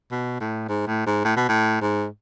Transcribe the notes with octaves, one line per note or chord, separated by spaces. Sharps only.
B2
A2
G#2
A2
G#2
A2
B2
A2
G#2